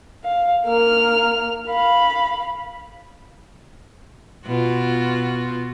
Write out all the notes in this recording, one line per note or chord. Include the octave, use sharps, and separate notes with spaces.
F5
A#3 F6
F5 B5
B2 F4 F#4